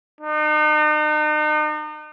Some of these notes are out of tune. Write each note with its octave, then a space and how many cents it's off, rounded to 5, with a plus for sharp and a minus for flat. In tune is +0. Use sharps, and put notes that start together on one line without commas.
D#4 -40